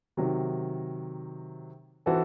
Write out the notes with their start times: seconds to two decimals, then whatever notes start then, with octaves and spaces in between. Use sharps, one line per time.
0.17 C3 D#3 F#3
2.06 E3 C4 F#4 A4